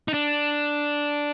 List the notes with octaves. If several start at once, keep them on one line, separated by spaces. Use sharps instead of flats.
D#4
D4